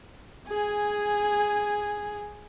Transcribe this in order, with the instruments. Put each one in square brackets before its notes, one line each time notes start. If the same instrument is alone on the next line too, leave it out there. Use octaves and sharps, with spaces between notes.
[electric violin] G#4 G#5